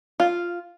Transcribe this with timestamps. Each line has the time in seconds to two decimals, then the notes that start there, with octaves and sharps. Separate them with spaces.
0.20 F4